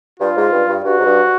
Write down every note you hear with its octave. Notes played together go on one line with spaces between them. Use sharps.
G2 F4
G#2
G2
G2
G2 F#4
G#2
G2